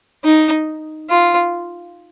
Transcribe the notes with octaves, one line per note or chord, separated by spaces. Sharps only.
D#4
F4